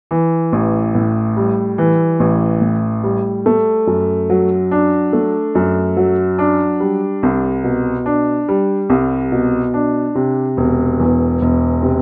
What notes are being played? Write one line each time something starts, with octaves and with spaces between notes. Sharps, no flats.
E3
A1
A2
G3
E3
A1
A2
G3
A3
F#2
F#3
D4
A3
F#2
F#3
D4
G3
C2
B2
D4
G3
C2
B2
D4
C3
E1
E2
E1
C3